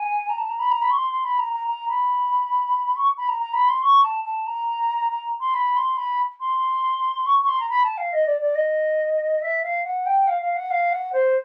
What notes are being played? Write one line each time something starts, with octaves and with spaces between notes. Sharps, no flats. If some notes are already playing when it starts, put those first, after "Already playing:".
Already playing: G#5
A#5
A5
A#5
B5
A#5
B5
C#6
C6
C6
B5
A#5
A#5
A#5
B5
C#6
B5
A#5
A#5
B5
C6
C#6
A5
A5
A#5
A#5
C6
B5
C6
B5
C6
C#6
C#6
C6
A#5
B5
A5
F5
D#5
D5
D5
D#5
E5
F5
F#5
G5
F5
F5
F#5
F5
F#5
C5